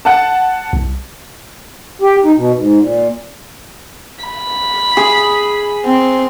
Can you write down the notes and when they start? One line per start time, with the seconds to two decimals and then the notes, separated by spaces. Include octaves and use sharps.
0.05 F#5 A5
0.73 C2
2.02 G4
2.24 D#4
2.36 B2
2.58 G#2
2.79 A#2
4.24 B5
4.97 G#4
5.86 C4